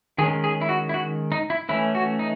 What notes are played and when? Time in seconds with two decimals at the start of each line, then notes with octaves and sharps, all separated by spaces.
0.18 D#3 G#3 C#4 G#4
0.44 G#4
0.61 E4
0.69 F#4
0.89 E4
0.94 F#4
1.32 D#4
1.50 E4
1.69 E3 A3 C#4 E4
1.95 F#4
2.19 D#4